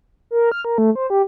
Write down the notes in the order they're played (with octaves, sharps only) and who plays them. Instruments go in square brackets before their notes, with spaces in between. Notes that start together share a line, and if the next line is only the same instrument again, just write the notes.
[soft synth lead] A#4
F6
A#4
A3
C5
G4